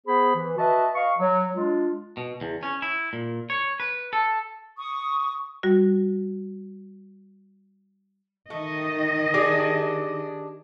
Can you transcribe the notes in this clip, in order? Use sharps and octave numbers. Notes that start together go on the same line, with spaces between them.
B3 G#4 C5 B5
E3
F#4 B4 D#5 E5 A5
D#5 F5 C#6
F#3
G#3 D4 F4
B2
E2
C#4
E4
A#2
C#5
B4
A4
C#6 D#6
G3 F#4
D#3 A3 D#5
D4 G4 G#4